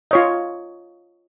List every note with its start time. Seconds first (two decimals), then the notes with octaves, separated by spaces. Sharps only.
0.11 F4 C#5 D#5